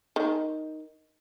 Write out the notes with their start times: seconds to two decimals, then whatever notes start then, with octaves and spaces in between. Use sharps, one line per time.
0.16 D#3